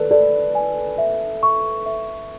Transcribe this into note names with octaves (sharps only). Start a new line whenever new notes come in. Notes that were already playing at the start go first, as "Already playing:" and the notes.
Already playing: A4 B4 D5
A4 D5
G#5
E5
C#6
E5